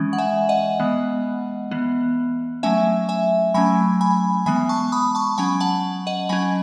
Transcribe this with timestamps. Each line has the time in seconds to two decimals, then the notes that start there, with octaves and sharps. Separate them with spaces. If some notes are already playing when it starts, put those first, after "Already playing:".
Already playing: E3 G#3 C#4
0.13 F#5
0.18 E5 G#5
0.49 D#5 F#5
0.80 E3 G#3 B3
1.71 E3 B3
2.63 F#3 A3 C#4 E5 G#5
3.09 E5 G#5
3.54 F#3 A3 C#4 G#5 B5
4.01 G#5 B5
4.46 E3 G#3 B3 G#5 B5
4.69 A5 C#6
4.92 B5 D#6
5.15 A5 C#6
5.38 F#3 C#4 G#5 B5
5.60 F#5 A5
6.07 D#5 F#5
6.29 F#3 C#4 G#5 B5